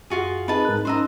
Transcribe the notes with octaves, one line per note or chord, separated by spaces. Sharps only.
F#2 F4 F#4 G#4
C4 D#4 G#4 B4 D#5 A5
G#2 A#4 F#6
C#4 D#4 C5 D#5 A#5 E6